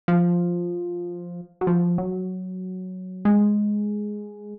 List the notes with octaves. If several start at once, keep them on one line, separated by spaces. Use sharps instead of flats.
F3
F#3
F3
F#3
G#3